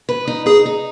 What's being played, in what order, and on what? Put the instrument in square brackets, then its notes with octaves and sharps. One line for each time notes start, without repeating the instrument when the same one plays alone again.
[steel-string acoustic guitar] B4
D#4
[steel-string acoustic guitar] D#4 [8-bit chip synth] G#4
[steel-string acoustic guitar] D#4